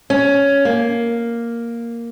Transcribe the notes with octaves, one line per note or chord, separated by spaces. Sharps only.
C#4
A#3